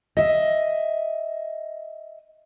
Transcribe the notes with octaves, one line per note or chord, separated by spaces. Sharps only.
D#5 E5